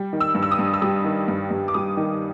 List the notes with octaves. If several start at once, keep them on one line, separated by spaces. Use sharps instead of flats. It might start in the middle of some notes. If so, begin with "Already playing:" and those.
Already playing: G3
D#3
E6
G2
E6
D#6
G2
E6
G3 D#6
D#3
G2
G2
D6
G3 D#6
D#3